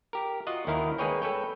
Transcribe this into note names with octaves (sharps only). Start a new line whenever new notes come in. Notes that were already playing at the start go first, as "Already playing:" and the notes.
G4 A#4
F4 F#4 D#5 F#5
D#2 D#3 E4 A#4 F5
G#3 A#3 G#4 B4 C#5 G5
A4 B4 C#5 G5